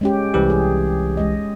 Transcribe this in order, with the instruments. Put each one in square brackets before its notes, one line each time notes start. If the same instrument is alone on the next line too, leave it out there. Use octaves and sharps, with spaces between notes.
[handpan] G#3 C#4 G4
[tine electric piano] C2 E3 G4
[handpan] G#4
G#3 D#5